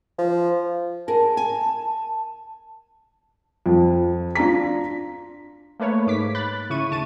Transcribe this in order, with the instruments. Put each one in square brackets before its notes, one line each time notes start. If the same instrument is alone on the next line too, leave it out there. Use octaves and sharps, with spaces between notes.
[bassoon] F3
[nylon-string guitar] G#4 A#4 [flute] A5
[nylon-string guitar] G#5
[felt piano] F2
D4 F4 A#5 B6
[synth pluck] A3 A#3 B4 C#5
G#2 D6 B6
B5 F#6 A6
C#3 E4 C#6 D#7
D2 A5 C#6 D#7